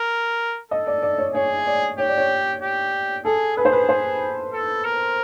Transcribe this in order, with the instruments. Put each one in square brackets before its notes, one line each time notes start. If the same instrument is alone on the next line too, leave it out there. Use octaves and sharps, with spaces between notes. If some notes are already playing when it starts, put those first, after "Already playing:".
Already playing: [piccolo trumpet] A#4
[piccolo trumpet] A4 [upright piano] D#5
[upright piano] D5
D5
C#5
[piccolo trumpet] G#4 [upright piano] C#5
[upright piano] D5
[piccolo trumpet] G4 [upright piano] C#5
[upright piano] D5
C#5
[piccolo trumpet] G4
[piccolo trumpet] G#4 [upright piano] A4
[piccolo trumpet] G#4 [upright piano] B4
[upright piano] C5
B4
C5
[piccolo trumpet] A4
A#4